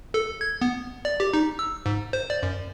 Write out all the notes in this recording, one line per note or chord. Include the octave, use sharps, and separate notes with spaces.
A4
G#6
B3
D5
G4
D#4
E6
G#2
C5
D5
F#2